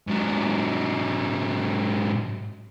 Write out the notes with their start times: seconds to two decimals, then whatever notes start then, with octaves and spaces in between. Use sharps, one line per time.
0.08 G#2 F#3